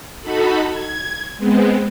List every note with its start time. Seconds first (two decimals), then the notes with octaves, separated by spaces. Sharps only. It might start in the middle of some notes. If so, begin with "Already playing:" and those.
0.22 D#4 F#4 A4 B5
0.71 G#6
1.37 G#3 B3 C4